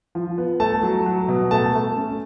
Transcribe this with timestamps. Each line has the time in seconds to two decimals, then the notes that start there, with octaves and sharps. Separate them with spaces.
0.15 F3
0.38 B3
0.60 A3 A5
0.83 F#3
1.06 F#3
1.28 B2
1.51 A3 A5
1.74 A3
1.96 C#4